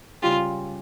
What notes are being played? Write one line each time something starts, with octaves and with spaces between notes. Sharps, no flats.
C#2 C#3 G3 C#4 F4 G4